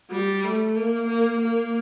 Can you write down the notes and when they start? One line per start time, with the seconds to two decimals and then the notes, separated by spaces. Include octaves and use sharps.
0.11 G3
0.44 A3
0.76 A#3
1.08 A#3
1.40 A#3